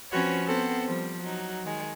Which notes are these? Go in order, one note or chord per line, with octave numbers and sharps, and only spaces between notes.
F3 C4 C#4 F#4 B4 C#5
B3 C4 A4 C5 F#5
F3 G3
F#3 D#4
D#3 G#3